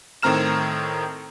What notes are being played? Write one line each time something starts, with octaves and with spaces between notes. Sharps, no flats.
A2 D#3 C4 A#5 F6 E7